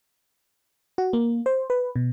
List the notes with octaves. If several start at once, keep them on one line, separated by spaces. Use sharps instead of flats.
F#4
A#3
C5
B4
B2